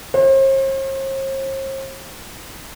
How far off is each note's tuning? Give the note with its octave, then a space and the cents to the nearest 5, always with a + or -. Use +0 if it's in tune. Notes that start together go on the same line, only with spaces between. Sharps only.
C5 +45